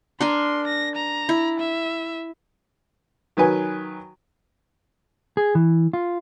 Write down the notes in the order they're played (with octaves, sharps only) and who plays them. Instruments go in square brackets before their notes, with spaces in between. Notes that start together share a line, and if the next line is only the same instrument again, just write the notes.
[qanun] D4 A#4 G#5 [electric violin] C6
[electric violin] A#6
A#5
[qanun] E4
[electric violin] E5
[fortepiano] D#3 F#3 B4 G#5
[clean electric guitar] G#4
E3
F4